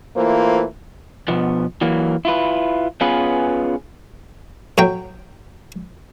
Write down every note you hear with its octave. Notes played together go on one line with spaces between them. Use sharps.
E3 A3 A#3 F4 C5
B2 F3 B3
E3 F#3 A#3
E4 F4 B4
B3 C#4 F4 G#4 B4
A2 F#3 G5